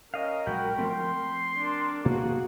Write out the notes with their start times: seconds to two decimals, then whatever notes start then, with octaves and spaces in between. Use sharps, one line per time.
0.14 C#4 A#4 D#5 F5
0.47 A#1 F#3 G#3 F#4 G5 B5
0.78 F3 A3 C4 C6
1.58 D4 A#4
2.05 B2 A#3 F#4 G#4